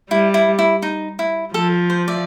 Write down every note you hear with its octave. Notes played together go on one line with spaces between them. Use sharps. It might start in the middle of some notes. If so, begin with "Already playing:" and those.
G3 E4
E4
E4
D#4
E4
F3 A4
C5
D5 E5